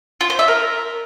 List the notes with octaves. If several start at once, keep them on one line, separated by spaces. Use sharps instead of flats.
F4
C5
E5
A#4